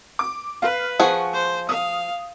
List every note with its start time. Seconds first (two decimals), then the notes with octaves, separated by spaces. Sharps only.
0.19 D6
0.62 B4 F5
1.00 F3 G#4 F#5 C#6
1.33 C5
1.69 F5 D#6